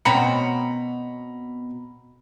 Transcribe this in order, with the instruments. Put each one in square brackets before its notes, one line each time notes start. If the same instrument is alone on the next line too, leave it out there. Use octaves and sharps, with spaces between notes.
[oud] B2 C4 C#4 [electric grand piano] A#5 B5 C#7